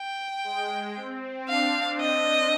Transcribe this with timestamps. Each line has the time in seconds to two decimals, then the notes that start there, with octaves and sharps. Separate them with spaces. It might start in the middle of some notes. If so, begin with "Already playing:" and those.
Already playing: G5
0.44 G#3
0.96 C4
1.48 D4 F5
2.00 D#5